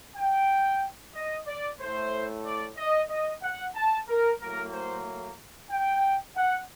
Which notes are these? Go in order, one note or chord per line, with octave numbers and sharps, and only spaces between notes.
G5
D#5
D5
A2 A3 C5
D5
D#5
D#5
F#5
A5
A#4
A2 F#3 A#3 A#4
C5
G5
F#5